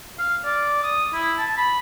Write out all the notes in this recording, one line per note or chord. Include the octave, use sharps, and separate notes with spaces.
F5
D5
D#6
E4
A5
B5